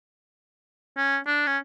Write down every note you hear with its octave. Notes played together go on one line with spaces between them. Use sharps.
C#4
D4
C#4